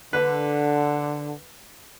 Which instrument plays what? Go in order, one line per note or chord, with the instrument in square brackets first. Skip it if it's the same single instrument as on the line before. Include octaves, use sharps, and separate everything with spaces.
[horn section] D3 [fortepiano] B4